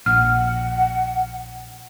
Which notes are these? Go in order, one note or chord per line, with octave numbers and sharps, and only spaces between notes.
A#1 F#5 F6